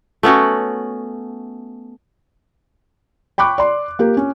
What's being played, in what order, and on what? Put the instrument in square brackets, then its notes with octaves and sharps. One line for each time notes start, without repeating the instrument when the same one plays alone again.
[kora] A3 B3 C#4 F#4
[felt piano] G5 B5 C#6 D6 F#6
D5 C6
A#3 G4 A#4
C#4